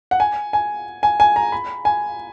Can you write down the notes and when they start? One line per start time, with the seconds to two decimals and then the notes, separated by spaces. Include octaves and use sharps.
0.11 F#5
0.20 G#5
0.53 G#5
1.03 G#5
1.20 G#5
1.36 A#5
1.52 B5
1.85 G#5